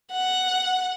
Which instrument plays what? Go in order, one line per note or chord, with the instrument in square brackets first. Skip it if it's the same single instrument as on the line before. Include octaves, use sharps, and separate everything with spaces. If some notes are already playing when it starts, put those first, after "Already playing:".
[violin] F#5